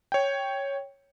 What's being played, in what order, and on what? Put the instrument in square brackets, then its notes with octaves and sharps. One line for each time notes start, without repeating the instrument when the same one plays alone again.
[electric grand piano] C#5 G5